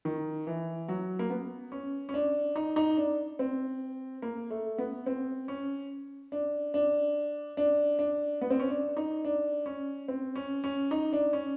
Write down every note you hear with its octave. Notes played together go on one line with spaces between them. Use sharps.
D#3
E3
F#3
A#3
B3
C#4
C#4
D4
D#4
D#4
D4
C4
A#3
A3
B3
C4
C#4
D4
D4
D4
D4
B3
C4
C#4
D4
D#4
D4
C#4
C4
C#4
C#4
D#4
D4
C#4